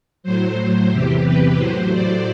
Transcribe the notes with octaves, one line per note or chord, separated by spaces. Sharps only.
A2 F#3 C5
C5
E2 C3 E3 G4
B4
A2 F#3 C5
D5